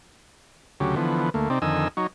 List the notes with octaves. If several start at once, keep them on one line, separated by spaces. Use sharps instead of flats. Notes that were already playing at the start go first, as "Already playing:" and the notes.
D2 C#3 F#3 G4
D3 E3 F3 B3
D2 A3 A#3
C3 C4 D#4 D5
F2 D3 D#3 D#5 G#5 E6
F#3 D#4 C#5